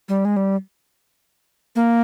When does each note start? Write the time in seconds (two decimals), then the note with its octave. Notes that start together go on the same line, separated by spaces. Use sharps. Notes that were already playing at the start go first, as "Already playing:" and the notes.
0.09 G3
0.25 G#3
0.37 G3
1.76 A#3